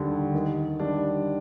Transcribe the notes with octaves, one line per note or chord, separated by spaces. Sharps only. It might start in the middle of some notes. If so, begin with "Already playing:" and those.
Already playing: D#2 D3 G3
D#3
G3 D4